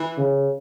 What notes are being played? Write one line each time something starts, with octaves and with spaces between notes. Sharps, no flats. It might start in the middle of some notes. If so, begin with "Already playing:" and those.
Already playing: E3
C#3